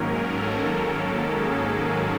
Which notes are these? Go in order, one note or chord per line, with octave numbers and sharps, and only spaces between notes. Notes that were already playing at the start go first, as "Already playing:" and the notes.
Already playing: G#2 D#3 F#3 A#3 C#4 A#4
A4
A4
G#4